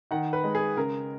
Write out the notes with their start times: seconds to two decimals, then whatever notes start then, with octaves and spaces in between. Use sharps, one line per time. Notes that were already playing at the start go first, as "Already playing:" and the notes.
0.11 D#3 F#5
0.33 B4
0.44 G#3
0.55 G#4
0.77 C#3 A#4